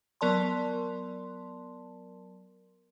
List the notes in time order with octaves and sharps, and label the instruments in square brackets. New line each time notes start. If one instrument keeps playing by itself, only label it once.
[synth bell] F#3 B3 A#4 D5 A5 C6